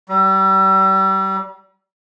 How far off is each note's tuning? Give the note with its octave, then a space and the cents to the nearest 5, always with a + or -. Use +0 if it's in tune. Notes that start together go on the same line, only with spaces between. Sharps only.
G3 -35